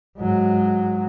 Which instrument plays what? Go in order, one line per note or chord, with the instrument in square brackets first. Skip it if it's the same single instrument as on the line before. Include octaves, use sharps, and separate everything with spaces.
[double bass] G#2 F#3